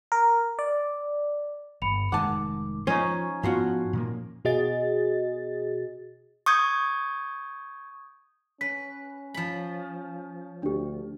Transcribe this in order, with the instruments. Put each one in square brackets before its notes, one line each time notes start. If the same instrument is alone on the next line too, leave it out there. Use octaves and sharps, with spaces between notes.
[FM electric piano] A#4
D5
[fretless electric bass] G1 [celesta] B5 C#7 F7
[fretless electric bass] F1 G#2 D#3 [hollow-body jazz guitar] F#5 A5 [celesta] D6
[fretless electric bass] F3 [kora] C#4 D#4 [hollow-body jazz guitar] C5 [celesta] C#6 G#6
[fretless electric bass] G#2 B3 [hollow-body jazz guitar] F3 F4 F#4
[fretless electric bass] A#2 F3 A#3
[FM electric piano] B2 F#4 G#4 D#5 A6
[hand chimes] C#6 D#6 G6 G#6
[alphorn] C#4 [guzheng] B4 [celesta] B6
[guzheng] F3 B5
[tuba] D2 [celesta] D4 G4